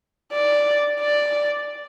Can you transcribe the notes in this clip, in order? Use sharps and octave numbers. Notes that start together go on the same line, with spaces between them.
D5
D5